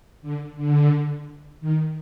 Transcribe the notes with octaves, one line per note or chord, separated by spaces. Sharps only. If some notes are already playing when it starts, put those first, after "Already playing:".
D3
D3
D#3